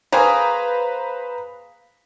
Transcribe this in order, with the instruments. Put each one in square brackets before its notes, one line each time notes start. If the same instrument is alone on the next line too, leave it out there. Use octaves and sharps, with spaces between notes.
[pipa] A#3 G#4 [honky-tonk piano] B4 C5 A#5